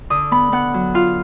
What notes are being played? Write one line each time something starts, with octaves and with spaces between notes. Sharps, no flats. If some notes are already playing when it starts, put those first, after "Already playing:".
D3 D#6
B3 B5
B3 F#5
F#3
F4 F5